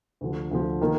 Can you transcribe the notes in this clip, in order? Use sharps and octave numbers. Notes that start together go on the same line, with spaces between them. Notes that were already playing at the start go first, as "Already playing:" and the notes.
D2 D3 F3
D2 D3 F3
D#3 A#3